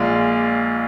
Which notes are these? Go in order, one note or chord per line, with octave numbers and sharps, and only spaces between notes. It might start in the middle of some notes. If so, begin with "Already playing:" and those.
Already playing: A#1 A#2 G#3 D5 F5